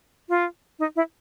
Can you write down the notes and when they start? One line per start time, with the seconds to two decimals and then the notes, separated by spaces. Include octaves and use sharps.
0.29 F4
0.79 D#4
0.96 E4